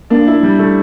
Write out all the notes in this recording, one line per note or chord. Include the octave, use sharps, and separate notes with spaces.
A#3 D4
E4
G3
A3